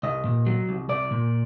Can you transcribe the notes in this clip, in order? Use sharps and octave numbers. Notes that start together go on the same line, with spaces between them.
C2 D#5
A#2
F#3
C2
C2 D5
A#2